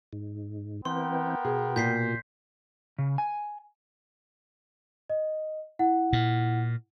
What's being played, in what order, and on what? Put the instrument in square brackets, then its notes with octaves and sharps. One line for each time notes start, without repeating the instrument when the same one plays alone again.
[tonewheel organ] G#2
[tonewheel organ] E3 C4 [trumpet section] B3 A#4 G5 [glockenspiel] C6
[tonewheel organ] B2 [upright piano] G#4
[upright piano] A#2 [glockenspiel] G6 B6 C7
[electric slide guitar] C#3
G#5
[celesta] D#5
E4 F#5
[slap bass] A#2